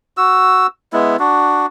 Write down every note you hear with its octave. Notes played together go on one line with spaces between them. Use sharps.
F#4 E6
G#3 B3 E4
D4 F#4